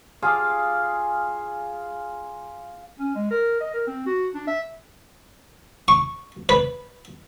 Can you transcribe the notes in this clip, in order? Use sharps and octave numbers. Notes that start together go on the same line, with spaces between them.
F4 G#4 F5 D6
C#4
G#3
A#4
D#5
A#4
C4
F#4
D4
E5
C#6
B4